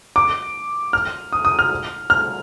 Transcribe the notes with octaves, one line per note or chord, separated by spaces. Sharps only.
D6
F6
D#6
D#6
F6
F6